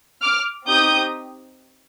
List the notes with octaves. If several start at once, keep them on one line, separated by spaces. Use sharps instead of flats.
D6 F6
C4 D#4 G4 D#6 G6